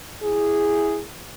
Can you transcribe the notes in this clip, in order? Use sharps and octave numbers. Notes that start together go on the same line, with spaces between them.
E4 G#4